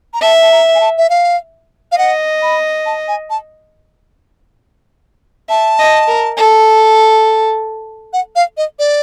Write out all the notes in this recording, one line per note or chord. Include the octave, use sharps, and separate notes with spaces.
A#5
E5 A5
A5
A#5
G#5
A5
E5
F5
F5
D#5 F#5
B5
A5
G#5
A5
E5 A5
D#5
A#4
A4
F#5
F5
D#5
D5